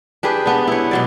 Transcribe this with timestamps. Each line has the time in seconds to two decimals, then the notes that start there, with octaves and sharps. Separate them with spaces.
0.23 D4 G4 G#4 B4
0.46 B3 D4
0.67 E4 C#5
0.91 B2 F#3 D5